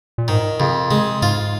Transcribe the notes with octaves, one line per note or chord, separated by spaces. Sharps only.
A#2
G#2 D#3
F2 C#3
C#3 G#3
G#2 F4